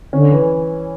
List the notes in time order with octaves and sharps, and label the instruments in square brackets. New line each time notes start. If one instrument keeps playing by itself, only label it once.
[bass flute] D3 [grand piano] C#4
[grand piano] E3